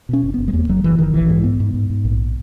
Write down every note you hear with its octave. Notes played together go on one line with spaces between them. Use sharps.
B2 C#4
F#1
F#1 B3
G#3
E2 A#3
F#1 F#3
F#1 E3
F#1 D#3
A#1 E3
G#2
G#2 B3
G#2
G#2
G#2
A#1